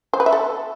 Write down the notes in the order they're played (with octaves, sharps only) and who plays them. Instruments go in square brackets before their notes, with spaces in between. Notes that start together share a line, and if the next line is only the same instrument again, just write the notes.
[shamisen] C5
B4
E5
A4